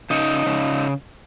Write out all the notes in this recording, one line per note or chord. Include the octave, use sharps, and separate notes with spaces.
C#3 D#4
C#3